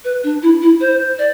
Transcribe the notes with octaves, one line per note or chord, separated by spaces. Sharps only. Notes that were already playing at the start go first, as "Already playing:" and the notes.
B4
D4
E4
E4
C5
D5